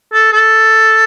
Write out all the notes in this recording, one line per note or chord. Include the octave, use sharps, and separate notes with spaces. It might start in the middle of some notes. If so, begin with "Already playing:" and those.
A4
A4